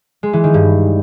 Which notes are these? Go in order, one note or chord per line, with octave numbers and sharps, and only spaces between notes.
G#3
E3
D#3
G2